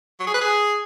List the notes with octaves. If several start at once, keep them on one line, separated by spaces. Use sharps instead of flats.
F#3
G#4
B4
G#4